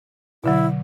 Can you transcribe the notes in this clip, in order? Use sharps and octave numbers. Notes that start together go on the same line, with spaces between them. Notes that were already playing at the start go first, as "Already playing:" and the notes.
B2 D3 F#3 E4